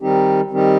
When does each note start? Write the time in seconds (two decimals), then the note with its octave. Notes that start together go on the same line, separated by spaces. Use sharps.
0.01 D#3 G3 C4 D#4 G4
0.50 D#3 G3 C4 D#4 G4